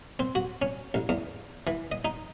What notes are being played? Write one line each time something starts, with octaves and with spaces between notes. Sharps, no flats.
C4
F#4
C#4
A1
E2
E3
D#5
D#4